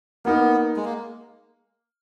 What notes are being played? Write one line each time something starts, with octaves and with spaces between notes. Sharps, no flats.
A#3 B3 D#4 A#4
G#3
A#3